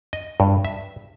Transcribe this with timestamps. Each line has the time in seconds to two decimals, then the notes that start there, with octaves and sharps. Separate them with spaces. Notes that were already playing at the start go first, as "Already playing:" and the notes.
0.13 D#5
0.40 G2
0.65 E5